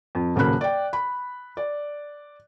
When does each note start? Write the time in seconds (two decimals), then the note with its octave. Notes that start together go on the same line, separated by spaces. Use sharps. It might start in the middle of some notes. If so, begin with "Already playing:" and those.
0.15 F2
0.36 D#1 C#3 F#3 A#3 B5 F#6
0.61 D5 G5
0.93 B5
1.57 D5